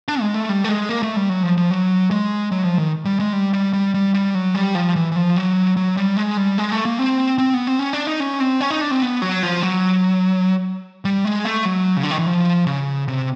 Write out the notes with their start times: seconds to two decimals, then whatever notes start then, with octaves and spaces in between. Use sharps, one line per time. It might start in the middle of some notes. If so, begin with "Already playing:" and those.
0.08 D4
0.21 G#3
0.34 A3
0.49 G3
0.64 A3
0.69 G#3
0.89 A#3
1.03 A3
1.16 G3
1.29 F#3
1.43 F3
1.57 F3
1.71 F#3
2.11 G#3
2.52 F#3
2.65 F3
2.79 D#3
3.05 G3
3.20 G#3
3.33 G3
3.53 G3
3.73 G3
3.94 G3
4.14 G3
4.34 F#3
4.55 G3
4.75 F3
4.96 E3
5.12 E3
5.16 F3
5.36 F#3
5.77 F#3
5.97 G3
6.17 G#3
6.37 G3
6.58 G#3
6.72 A3
6.85 A#3
6.99 C4
7.39 C4
7.54 B3
7.67 C4
7.79 C#4
7.93 D4
8.07 D#4
8.20 C#4
8.40 C4
8.61 C#4
8.71 D#4
8.81 D4
8.91 C4
9.02 B3
9.22 F#3
9.43 F3
9.63 F#3
11.05 G3
11.25 G#3
11.45 A3
11.65 F#3
11.97 C#3
12.03 D3
12.11 D#3
12.18 E3
12.26 F3
12.67 C#3
13.08 C3